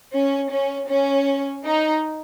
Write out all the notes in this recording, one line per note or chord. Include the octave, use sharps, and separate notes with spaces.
C#4
C#4
C#4
D#4